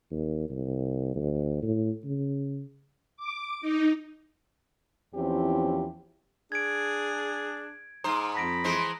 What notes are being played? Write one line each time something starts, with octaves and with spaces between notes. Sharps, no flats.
D#2
C2
D2
A2
C#3
D6
D#4
E2 F3 C4 C#4 E4 G4
D4 G#4 G#6 D7
G#2 C5 A#5 D#6
F2 A5 B5 A#6 D7
E3 G#3 C5